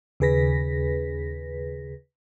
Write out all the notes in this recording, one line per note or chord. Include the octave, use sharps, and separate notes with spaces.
D#2 C#3 G#4 B4 A#6 B6